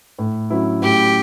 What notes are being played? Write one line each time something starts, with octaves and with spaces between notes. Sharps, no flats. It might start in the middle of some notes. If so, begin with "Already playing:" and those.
A2
F#3 C#4 E4
A2 G4